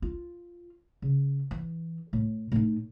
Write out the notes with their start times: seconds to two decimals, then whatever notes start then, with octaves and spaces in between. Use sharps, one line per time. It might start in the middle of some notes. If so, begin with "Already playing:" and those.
0.02 F4
1.02 C#3
1.51 E3
2.13 A2
2.52 A2 D#4